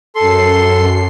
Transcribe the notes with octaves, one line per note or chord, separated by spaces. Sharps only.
F#2 A4 C6 C7